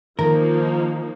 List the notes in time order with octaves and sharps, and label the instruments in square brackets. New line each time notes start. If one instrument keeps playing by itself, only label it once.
[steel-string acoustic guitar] D#3 [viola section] F3 A#3 D#4 [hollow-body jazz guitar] A#4